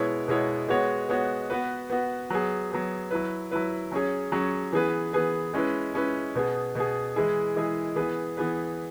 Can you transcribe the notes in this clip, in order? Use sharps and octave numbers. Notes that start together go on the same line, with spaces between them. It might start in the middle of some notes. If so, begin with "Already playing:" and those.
Already playing: B2 G#3 B3 E4 C#5
B2 G#3 B3 E4 C#5
G#3 B3 F#4 C#5
G#3 B3 F#4 C#5
B3 F#4 B4
B3 F#4 B4
F#3 B3 G#4
F#3 B3 G#4
F#3 E4 B4
F#3 E4 B4
F#3 C#4 G#4 C#5
F#3 C#4 G#4 C#5
E3 B3 G#4 B4
E3 B3 G#4 B4
G#3 C#4 E4 B4
G#3 C#4 E4 B4
B2 B3 G#4
B2 B3 G#4
E3 G#3 E4 G#4
E3 G#3 E4 G#4
E3 B3 G#4 B4
E3 B3 G#4 B4